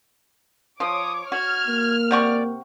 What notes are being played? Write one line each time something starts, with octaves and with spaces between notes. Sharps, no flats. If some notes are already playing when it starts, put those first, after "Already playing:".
F3 C#5 D6 D#6
F#4 F6 G#6
A#3
C3 D5 F#5 C#6